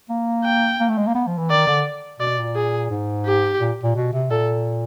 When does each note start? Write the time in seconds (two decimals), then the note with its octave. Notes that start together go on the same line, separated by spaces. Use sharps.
0.10 A#3
0.45 G5
0.80 A#3
0.89 A3
0.98 G#3
1.07 A#3
1.15 B3
1.27 F3
1.38 E3
1.50 D#3 D5
1.67 D3
2.20 B2 D5
2.38 A#2
2.55 G#4
2.91 G#2
3.26 G4
3.61 A#2
3.83 A#2
3.96 B2
4.13 C3
4.30 A#2 A4